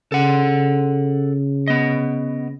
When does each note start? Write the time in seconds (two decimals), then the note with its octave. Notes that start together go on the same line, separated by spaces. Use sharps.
0.12 C#3 A4 F#5
1.68 B3 D#5